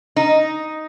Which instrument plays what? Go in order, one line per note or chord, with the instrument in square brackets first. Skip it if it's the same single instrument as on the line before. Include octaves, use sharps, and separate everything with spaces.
[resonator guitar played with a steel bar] D#4